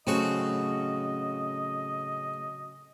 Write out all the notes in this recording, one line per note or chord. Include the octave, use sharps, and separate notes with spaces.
A2 C#3 F#3 C4 C#4 F#4 A4 D#5